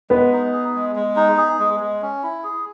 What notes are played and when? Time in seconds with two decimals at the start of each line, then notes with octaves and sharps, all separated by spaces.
0.10 G#3 B3 B4
0.32 D#4
0.53 G#4
0.75 G#3
0.96 G#3
1.16 D#4
1.38 G#4
1.60 G#3
1.80 G#3
2.02 C#4
2.23 E4
2.44 G#4